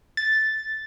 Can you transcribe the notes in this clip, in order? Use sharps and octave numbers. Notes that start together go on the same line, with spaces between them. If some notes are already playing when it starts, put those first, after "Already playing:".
A6